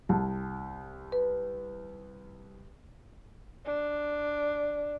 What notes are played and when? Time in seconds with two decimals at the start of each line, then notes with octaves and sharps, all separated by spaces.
0.09 C2 A5
1.12 B4
3.66 D4